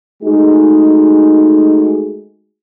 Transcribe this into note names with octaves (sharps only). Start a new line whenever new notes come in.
G#3 A3 D#4 F#4 G#4